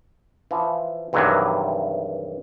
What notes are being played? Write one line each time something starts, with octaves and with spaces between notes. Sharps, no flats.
E3 F3
E2 G2 C3 D#3 E3 F#3